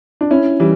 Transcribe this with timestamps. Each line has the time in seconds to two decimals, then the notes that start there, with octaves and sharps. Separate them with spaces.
0.21 D4
0.30 C#4 E4
0.60 E3 G3